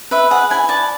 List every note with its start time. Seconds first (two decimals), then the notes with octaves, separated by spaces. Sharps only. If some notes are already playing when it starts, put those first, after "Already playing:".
0.11 B4 E5
0.30 G#4 F#5
0.50 E4 G#5
0.69 D5 A5